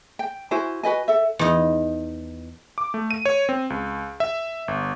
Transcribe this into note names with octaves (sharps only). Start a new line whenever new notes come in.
G5
E4 F#4 C5 G#5
F#4 B4 D#5 G#5
A4 E5
E2 D#4
D6
A3
D#7
C#5
C4
C#2
E5
G1